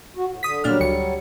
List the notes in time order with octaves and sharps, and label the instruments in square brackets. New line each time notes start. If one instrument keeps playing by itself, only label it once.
[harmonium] F#4
A2
[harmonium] D3 [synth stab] D#6 B6
[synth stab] A#2 D4 F6 [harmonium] F#3 G3
[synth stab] D2 C#7